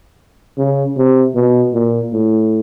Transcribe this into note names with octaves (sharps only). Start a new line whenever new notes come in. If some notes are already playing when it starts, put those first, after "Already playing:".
C#3
C3
B2
A#2
A2